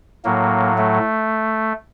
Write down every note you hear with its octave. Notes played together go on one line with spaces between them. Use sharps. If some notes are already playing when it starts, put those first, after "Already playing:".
A2 F#3 A#3
A3